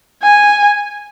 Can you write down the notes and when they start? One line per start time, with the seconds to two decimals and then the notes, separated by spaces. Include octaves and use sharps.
0.22 G#5